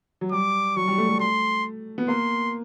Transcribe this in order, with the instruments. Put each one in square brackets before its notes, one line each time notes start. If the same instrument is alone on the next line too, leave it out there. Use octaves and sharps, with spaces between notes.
[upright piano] F#3
[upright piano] G3 [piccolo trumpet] D6
[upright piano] F#3 [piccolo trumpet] C#6
[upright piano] G3
A3
A3
[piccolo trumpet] C6
[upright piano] B3
[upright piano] A#3 [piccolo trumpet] C6